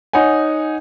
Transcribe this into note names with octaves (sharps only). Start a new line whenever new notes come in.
D#4 C#5 F#5 G#5